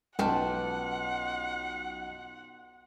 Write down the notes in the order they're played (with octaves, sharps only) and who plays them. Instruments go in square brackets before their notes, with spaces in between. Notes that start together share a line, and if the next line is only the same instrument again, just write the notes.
[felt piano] B1 [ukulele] C#4 G5 A5 [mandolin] F4 B4 D5 [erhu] F#5